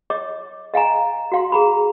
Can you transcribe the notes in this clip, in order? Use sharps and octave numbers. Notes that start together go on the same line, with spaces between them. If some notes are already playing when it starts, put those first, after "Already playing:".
C#5 D#5 D6
D#5 F5 G#5 A#5
F#4 F5 C6
G#4 A#5 B5